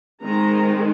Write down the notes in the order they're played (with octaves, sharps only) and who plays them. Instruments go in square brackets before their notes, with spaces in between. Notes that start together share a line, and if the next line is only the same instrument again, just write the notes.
[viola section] D#3 G#3 C4 A#5